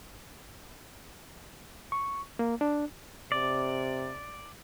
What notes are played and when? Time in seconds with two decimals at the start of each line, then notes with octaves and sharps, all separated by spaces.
1.92 C#6
2.39 A#3
2.61 D4
3.32 C3 D5